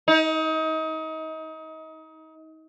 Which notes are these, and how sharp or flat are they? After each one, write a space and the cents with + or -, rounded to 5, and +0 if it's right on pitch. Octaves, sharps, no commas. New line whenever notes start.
D#4 +30